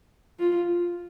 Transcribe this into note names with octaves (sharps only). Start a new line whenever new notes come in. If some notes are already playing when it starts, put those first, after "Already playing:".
F4